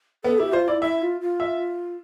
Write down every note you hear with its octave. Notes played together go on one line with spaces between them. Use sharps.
B3 A4
E4 G4
F4 C5
E4 D5
E4 E5
F4
F4
E5